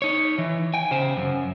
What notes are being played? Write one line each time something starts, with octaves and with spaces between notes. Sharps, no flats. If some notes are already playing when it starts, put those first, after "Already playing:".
D#4 C#5
E3
G5 G#5
C#3 C5
F#2